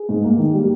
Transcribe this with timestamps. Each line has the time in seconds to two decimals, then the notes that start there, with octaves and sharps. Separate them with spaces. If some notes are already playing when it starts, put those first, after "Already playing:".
Already playing: G#4
0.09 G#2
0.24 A#3
0.39 D#3
0.54 G3